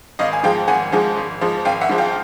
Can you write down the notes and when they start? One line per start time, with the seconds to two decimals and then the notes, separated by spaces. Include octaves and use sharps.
0.19 G#1 D#5 F5
0.33 G#5
0.43 G#2 F3 G#3 F5 G5
0.68 G#1 F#5 G#5
0.92 G#2 F3 G#3
1.17 G#1
1.41 G#2 F3 G#3
1.65 G#1 F5 G5
1.81 E5 F#5
1.89 G#2 F3 G#3
1.98 F5 G5